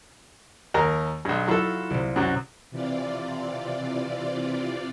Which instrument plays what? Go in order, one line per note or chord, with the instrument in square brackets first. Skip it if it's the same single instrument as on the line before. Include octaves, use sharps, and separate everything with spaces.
[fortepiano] D#2 A#4 A#5
B1 G2
[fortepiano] F#3 A4 [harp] E4 F4
[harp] C2 C3
[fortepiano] F#2 F#3
[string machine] C3 E3 F4 D5